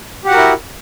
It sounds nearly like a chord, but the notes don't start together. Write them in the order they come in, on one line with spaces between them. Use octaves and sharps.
G4 F#5 F#4 A#4 E4